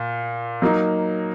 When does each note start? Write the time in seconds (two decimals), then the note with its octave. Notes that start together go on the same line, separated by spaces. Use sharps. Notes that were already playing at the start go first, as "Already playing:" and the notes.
Already playing: A#2
0.62 F#3 A#3 D#4